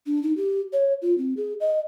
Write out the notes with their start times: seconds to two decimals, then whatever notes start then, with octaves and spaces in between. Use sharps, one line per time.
0.06 D4
0.23 D#4
0.37 G4
0.73 C#5
1.02 F4
1.18 C4
1.37 G#4
1.60 D#5